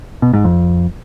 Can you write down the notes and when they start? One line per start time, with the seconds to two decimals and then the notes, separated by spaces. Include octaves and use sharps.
0.22 B2
0.33 G#2
0.45 F2